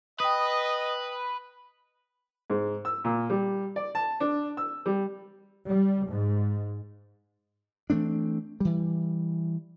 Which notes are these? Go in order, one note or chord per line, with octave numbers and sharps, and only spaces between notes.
B4 D#5 G5 D#6
G#2
E6
A#2
G3
D5
A5
D4
E6
G3
G3
G#2
E3 A3 C4 D4
E3 G3